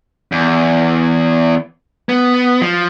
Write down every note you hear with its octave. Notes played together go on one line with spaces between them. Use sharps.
E2
B3
F3